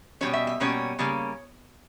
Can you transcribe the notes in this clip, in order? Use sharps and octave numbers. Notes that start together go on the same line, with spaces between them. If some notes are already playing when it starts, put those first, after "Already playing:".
B2 G3 A#3 C#4 C#5
E5
E5
B2 G3 A#3 C#4 C#5
C#3 G3 A#3 C#4